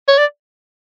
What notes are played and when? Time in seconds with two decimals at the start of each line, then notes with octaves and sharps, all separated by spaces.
0.08 C#5
0.18 D5